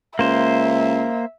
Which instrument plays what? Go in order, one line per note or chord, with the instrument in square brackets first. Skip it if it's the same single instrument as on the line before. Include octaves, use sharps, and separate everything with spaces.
[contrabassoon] C#2 [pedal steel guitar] A#3 C5 [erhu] E5